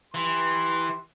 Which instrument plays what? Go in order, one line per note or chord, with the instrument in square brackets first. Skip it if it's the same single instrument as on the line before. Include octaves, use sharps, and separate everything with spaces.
[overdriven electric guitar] E3 [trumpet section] G4 B4 C6